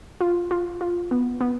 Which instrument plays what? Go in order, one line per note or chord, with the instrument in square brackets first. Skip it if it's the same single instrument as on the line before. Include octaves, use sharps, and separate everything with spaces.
[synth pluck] F4
F4
F4
B3
B3